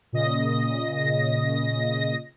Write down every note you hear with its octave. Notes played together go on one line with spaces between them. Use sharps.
A#2 C#3 D#5 A#6